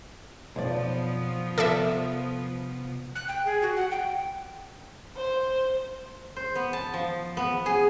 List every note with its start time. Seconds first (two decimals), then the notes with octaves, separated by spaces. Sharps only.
0.56 B1 F2 F3 B3 D5
1.58 C3 A4 D5 E5
3.15 F#6
3.28 G5
3.45 G#4
3.62 F#4
3.76 F#5
3.91 G5
5.16 C5
6.36 C5
6.55 B3
6.73 A5
6.94 F3
7.37 B3
7.66 G#4